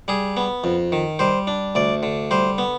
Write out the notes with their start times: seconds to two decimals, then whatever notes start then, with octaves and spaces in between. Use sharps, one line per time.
0.08 G3 G#4
0.37 B3
0.64 F2
0.92 D#3
1.19 G3 C5
1.47 D4
1.75 D2 D5
2.03 D3
2.31 G3 C5
2.58 B3